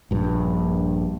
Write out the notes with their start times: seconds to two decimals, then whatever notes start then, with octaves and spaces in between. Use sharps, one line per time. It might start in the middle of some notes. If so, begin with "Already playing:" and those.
0.11 A#1 G2